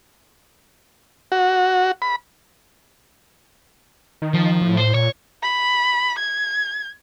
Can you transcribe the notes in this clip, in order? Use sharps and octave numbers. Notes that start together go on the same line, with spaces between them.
F#4
B5
D#3
F3
A2
C5
A#2 C#5
B5
G#6